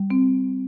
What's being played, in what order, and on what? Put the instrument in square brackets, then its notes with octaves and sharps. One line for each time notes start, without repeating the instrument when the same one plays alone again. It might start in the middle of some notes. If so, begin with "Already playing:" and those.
Already playing: [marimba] G3
C4